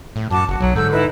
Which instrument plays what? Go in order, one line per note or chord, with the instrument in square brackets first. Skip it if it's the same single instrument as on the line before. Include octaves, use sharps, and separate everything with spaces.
[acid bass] A2
[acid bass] F#2 [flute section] F#4 A5 D6
[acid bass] F#1 [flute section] F#4
[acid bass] B1 [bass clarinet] F#3
[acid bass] G#2 [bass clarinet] D3 [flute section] E6 G6
[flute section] D#4 E4 B4